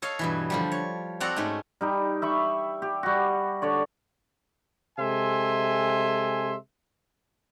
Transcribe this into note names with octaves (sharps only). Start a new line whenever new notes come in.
A4 C#5 D#5 F5
G2 B2 E3
D3 F3 G3
C#5
C4 F#4 A4 D5 F#5 A#5
G#2 A3 C#4 D#4
G3 D#4 G5
E5 B5 C#6
G4
G3 F#4
D3 C#5 D5
C3 G#3 A4 E5 G#5 C6